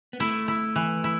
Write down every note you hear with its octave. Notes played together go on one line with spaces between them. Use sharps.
B3
A3 E4
E4
E3
E4